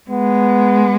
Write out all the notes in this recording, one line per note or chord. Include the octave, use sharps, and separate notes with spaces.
G#3 B3